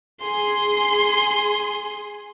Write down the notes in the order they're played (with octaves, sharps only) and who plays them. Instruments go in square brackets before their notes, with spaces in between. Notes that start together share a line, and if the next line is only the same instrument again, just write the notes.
[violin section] G#4 [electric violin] C6